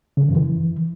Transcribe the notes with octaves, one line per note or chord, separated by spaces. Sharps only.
C#3
D#3
F#2
E3